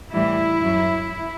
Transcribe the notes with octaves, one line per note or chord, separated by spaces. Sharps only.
A2 E3 G3 E4
F#2 F#3